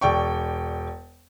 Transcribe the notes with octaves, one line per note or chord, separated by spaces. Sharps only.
E1 D5 G5 C#6